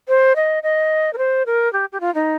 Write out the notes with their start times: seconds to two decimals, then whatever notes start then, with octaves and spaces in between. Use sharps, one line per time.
0.08 C5
0.36 D#5
0.63 D#5
1.13 A#4
1.18 C5
1.46 A#4
1.73 G4
1.92 G4
2.01 F4
2.15 D#4